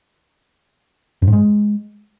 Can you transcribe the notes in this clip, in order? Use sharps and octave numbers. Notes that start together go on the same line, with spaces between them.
F#2
G#2
G#3